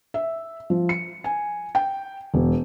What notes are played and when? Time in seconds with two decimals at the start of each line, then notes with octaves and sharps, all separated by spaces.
0.14 E5
0.70 F3
0.89 C#7
1.24 G#5
1.75 G5
2.34 E1